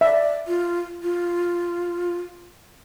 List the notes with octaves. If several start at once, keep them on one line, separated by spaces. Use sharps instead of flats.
D5 E5
F4
F4